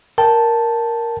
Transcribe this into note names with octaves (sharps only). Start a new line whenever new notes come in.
A#4 G5 A5